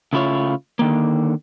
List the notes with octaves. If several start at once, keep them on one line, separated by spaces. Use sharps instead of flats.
C#3 A3 E4 F4 C#5
D3 D#3 A#3